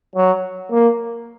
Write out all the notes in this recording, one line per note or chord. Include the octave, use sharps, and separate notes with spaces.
F#3
A#3